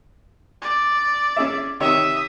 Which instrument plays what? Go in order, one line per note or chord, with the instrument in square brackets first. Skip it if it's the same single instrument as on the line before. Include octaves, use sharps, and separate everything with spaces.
[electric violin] D5
[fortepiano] C#4 G#4 E5
[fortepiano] C3 D#3 C#5 [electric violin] E5 D#6